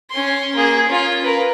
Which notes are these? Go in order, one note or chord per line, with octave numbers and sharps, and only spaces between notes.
C#4 C6
A#3 G#4
C#4 F4
A#4 B4